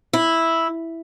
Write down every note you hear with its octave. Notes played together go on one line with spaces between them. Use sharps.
E4